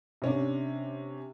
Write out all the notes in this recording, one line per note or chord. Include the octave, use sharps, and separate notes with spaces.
C3 C#4 D4